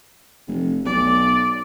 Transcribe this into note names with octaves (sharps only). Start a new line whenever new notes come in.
F1
B1 D5